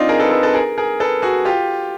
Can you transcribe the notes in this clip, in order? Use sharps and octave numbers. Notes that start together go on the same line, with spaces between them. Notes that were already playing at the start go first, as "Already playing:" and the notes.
Already playing: C4 D4 D#4 F4
G#4 A#4
A4 B4
A4 B4
A4 B4
G#4 A#4
G#4 A#4
A4 B4
F#4 G#4
F4 G4